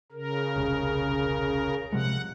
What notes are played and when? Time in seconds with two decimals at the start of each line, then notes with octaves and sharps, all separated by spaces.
0.12 C#3 A#4
0.56 E1 C2
1.92 C3 F3 G#3 F#5